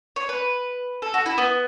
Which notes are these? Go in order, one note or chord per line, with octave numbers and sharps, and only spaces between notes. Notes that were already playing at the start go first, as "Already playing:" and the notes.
C#5
B4
A4
F#4
E4
B3